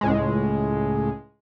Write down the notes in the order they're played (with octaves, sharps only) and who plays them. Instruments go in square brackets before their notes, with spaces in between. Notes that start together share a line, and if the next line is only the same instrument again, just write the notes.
[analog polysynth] C#2 A2 G#3